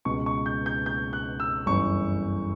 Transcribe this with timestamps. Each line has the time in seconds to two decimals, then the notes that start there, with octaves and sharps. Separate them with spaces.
0.05 C#2 B2 C#6
0.26 C#6
0.46 G6
0.66 G6
0.86 G6
1.13 F#6
1.40 E6
1.66 G1 F#2 E3 C#6